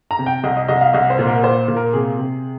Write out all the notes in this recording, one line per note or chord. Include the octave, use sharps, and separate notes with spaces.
A#5
C3
G5
C2 D#5
D#5
C2 D#5
F5
C2 D#5
C5
A#2
A#4
A#2 C5
A#2
A#4
C3 G#4
C3